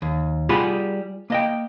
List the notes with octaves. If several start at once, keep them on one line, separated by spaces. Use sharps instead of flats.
D#2
G3 F4 G4 G#4 F#5 B5
A#3 D#5 G5